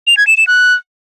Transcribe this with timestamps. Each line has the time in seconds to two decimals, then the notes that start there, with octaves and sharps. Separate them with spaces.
0.07 F7
0.17 G#6
0.27 E7
0.37 E7
0.47 F#6